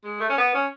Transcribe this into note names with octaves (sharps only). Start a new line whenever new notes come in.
G#3
A3
C#4
B3
C#4